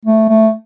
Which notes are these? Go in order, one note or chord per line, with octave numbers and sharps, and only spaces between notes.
A3
A3